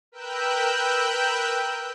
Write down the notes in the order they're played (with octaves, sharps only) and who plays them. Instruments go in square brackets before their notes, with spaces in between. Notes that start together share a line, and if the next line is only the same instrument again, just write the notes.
[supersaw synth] A#4 B4 G5 E6 F#6 G6